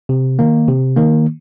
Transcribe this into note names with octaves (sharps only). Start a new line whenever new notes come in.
C3
D#3 A#3
C3
D#3 A#3